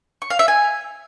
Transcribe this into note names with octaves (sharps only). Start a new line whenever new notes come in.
C#6
F5
E5
G#5